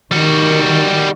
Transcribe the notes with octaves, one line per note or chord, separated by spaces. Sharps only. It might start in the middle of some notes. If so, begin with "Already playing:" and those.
D#3 G3 F#4